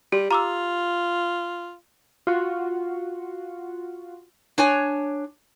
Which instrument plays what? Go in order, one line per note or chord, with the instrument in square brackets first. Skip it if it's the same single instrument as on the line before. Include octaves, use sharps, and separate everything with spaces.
[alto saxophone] G3 [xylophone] G4
[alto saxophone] F4 [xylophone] A#5 D6 E6
[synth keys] F4 F#4
[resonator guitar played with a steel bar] D4 C#5 G#5